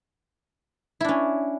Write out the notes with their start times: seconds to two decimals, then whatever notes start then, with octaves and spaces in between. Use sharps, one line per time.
1.00 E4
1.04 D4
1.08 C#4